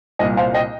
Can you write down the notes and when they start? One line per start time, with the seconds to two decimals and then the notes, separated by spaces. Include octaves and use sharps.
0.19 C2 A#2 D#5
0.37 C5 F5
0.54 D#5 G5